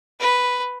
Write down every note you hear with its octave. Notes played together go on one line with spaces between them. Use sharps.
B4